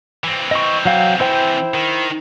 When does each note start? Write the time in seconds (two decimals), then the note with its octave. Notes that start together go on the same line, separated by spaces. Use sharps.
0.24 E3 C4
0.51 D#5 C#6
0.85 F#3 F5 G5
1.20 E4 C5 G5
1.74 D#3